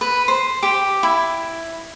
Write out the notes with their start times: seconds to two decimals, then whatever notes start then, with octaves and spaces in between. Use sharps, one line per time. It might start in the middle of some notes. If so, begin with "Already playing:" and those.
0.01 B4
0.28 C5
0.63 G4
1.03 E4